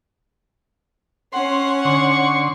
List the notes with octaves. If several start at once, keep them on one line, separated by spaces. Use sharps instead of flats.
C#4 F#5 C6
D3 C6 C#6